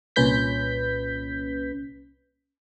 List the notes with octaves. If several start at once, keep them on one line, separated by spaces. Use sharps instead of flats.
C2 A#2 C#4 B4 G6 B6